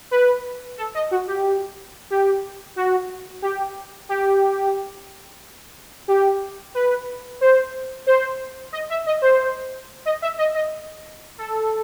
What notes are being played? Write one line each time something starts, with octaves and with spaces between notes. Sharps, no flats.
B4
A4
D#5
F#4
G4
G4
F#4
G4
G4
G4
B4
C5
C5
D#5
E5
D#5
C5
D#5
E5
D#5
D#5
A4